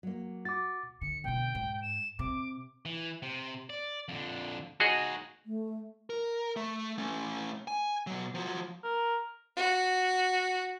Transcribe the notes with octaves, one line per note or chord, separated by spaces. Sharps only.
F#3 A#3
F#4 D6 A6
D3 C#7
B2 D3 G5
G#2
E7
C3 D6
E3
C3
D5
F2 D3
D#4 F#4 G#4 C#5 D#5
A3
A#4
A3
A3 C#4
G#5
B2 F#3
F3 F#3
A#4
F#4